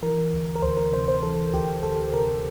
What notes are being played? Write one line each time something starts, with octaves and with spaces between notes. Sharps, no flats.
E3 A#4
D2
A#4
D2 C5
A#4
C3 C5
C5
E3 A4
D2 G4
D2 A4
C3 A#4